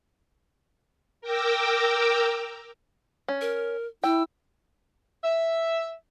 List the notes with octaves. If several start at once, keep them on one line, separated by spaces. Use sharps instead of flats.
A#4 G5 A#5 D6 E6
C#4
A#4
E4 G5 E6
E5